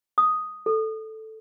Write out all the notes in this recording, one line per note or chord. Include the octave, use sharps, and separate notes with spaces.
D#6
A4